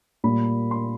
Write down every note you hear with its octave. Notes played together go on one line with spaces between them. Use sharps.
A#2 G3 A#3 B5
C6